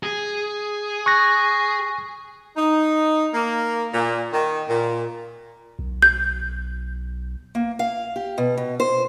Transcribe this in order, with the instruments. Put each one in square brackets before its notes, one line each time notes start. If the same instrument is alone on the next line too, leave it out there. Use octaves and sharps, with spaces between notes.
[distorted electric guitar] G#4
[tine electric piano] C#6 F#6 A#6
[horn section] D#4
A#3
A#2
D#3
A#2
[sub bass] B1
[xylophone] G6
[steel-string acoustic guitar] A#3
F5
G4
B2
B2
C5